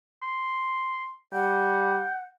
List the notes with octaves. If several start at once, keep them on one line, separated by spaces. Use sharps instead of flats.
C6
G3 F#5 G5